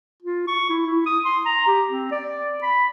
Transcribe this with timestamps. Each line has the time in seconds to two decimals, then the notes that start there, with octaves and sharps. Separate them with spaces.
0.23 F4
0.48 C#6
0.69 E4
0.87 E4
1.06 D#6
1.25 C6
1.46 A#5
1.67 G4
1.88 C4
2.12 D5
2.63 B5